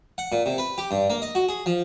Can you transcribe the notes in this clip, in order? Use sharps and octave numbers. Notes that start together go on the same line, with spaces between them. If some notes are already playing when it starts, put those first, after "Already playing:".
F#5
A#2
C3
B4
G4
G2
A#3
D#5
F#4
G#4
F3